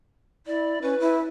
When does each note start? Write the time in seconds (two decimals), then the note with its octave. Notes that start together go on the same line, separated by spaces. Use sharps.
0.47 E4 D5
0.82 C#4 B4
1.00 E4